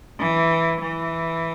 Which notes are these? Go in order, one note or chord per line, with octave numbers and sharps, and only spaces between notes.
E3
E3